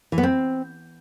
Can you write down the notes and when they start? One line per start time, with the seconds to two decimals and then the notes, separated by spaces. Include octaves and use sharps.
0.12 E3
0.18 B3
0.23 C4